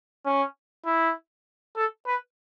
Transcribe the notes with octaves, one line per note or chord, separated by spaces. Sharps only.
C#4
E4
A4
B4